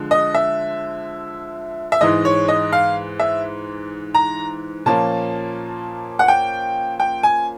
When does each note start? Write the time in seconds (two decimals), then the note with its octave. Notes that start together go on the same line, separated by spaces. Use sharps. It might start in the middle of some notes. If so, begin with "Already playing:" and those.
Already playing: D3 F3 G#3
0.11 D#5
0.35 E5
1.92 E5
2.01 G#2 E3 G#3 D#5
2.25 C#5
2.48 D#5
2.72 F5
3.19 E5
4.15 A#5
4.86 A#2 F3 A#3 C#4 A5
6.19 F#5
6.28 G5
7.00 G5
7.23 G#5